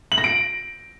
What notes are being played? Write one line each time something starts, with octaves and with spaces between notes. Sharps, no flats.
F#7
A#6
D7